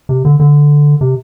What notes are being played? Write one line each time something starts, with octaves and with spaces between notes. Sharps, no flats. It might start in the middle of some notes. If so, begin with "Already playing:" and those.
C3
D3
D3
C3